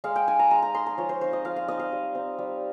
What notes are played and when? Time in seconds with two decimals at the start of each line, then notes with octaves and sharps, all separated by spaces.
0.04 G#3 F5
0.16 G5
0.28 D#4 G#5
0.39 A#5
0.51 G#3 A#5
0.63 A#5
0.74 D#4 C6
0.86 A#5
0.98 F3 C#5
1.09 C5
1.21 C4 D#4 C5
1.33 D#5
1.45 F3 F5
1.56 F5
1.68 C4 D#4 D#5
1.79 F5
1.92 G3
2.15 C4 D#4
2.38 G3